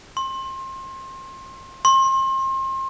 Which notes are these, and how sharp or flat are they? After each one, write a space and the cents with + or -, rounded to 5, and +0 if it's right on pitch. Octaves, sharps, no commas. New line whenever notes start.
C6 +30
C6 +35